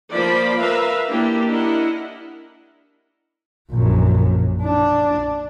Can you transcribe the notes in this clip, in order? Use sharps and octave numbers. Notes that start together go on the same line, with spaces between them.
F3 A#3 C5 D5 B5
A#4 B4 E5 F5 A#5
A#3 D4 E4 G4
D4 E4 A#4 D#5 F#5
A#1 F#2
D4